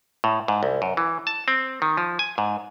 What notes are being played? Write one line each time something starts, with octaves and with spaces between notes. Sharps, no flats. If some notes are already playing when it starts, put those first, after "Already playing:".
A2
G#2
C2
F#2
E3
A5
C4
D#3
F3
G#5
G#2